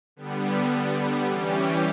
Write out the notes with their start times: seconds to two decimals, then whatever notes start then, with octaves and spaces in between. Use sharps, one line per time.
0.16 D3 G3 B3
1.28 E3 G3 C#4 G4